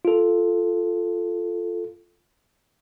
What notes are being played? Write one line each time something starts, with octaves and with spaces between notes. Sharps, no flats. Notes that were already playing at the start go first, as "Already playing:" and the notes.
F4 A4